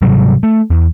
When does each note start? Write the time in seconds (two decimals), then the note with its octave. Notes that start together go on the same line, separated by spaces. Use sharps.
0.02 G#2 C3 F#3 G3
0.43 A3
0.70 E2